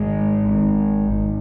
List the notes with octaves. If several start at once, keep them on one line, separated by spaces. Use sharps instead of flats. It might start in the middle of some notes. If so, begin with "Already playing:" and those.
Already playing: G#1 G#2 G#3
G#1 G#2
G#1 G#2